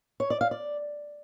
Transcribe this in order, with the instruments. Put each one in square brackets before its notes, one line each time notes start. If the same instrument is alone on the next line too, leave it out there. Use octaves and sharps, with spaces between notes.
[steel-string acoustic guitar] C#5
D5
F5
D5